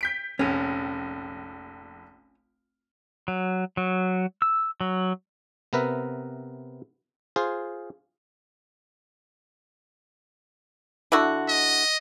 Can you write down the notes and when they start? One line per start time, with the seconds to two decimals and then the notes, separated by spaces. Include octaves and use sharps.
0.01 G6 B6 D7
0.39 F1 A#1 C#4
3.28 F#3
3.77 F#3
4.42 E6
4.81 F#3
5.73 C3 B3 A#4 B4 E5
7.36 F4 G#4 C5
11.12 D3 E4 F#4
11.49 D#5